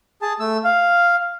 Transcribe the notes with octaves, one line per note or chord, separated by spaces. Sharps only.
G#4 A5
A3 E6
F5